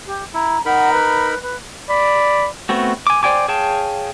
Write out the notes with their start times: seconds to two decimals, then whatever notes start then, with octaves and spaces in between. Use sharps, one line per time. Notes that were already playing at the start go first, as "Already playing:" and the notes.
0.06 G4
0.34 E4 A#5
0.66 D#4 A#4 F#5 B5
0.92 B4
1.42 B4
1.90 D5 B5
2.69 A3 B3 C4 F#4
3.07 G#5 D6
3.23 C5 D5 G5 G#5 D6
3.48 G#4 C#5 F5 G5 A5